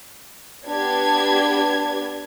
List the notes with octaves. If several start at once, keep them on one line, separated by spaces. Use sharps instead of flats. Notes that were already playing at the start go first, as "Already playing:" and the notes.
B3 D4 G4 G#6